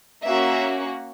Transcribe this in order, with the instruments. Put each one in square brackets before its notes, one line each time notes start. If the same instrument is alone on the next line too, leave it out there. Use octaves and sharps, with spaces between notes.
[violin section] A#3 C#4 F#4 E5